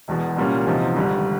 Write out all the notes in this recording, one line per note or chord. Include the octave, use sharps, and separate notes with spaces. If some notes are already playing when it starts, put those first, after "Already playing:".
E1 E2 B2
C2 A#2 G3 A#3 C#4
E2 C3 F3 A#3 D#4
G#1 G2 D3 G3